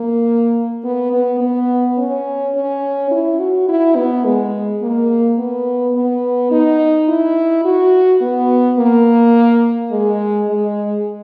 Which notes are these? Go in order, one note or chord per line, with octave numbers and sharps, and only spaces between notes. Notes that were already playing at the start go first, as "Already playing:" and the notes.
Already playing: A#3
B3
B3
B3
C#4
C#4
E4
F#4
E4
B3
G#3
A#3
B3
B3
D#4
E4
F#4
B3
A#3
G#3
G#3